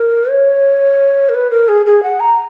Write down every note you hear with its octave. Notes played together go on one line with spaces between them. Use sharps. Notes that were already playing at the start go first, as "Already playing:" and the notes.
Already playing: A#4
C#5
A#4
B4
A#4
G#4
G#4
F#5
A#5